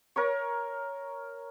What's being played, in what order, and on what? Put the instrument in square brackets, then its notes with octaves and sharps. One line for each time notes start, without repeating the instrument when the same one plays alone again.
[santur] A#4 C#5 C#6